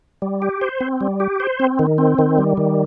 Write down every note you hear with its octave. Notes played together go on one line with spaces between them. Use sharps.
G3
G4
C5
C4
G3
G4
C5
C4
D#3
C4
D#3
G3
D#3